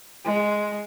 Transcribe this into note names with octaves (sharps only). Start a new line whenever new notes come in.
G#3